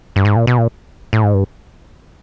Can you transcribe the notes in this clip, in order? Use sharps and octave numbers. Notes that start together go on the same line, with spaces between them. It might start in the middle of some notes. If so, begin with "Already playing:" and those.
G2
G#2
A#2
B2
A#2
A2
G#2
G2